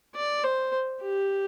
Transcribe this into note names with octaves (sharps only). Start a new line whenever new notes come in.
D5
C5
G4